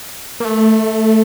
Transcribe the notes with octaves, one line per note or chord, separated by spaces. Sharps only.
A#3
A3